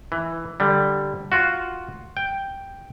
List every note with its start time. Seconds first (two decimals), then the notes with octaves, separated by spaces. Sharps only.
0.12 E3
0.60 D3 G3
1.32 F4 F#4
2.17 G5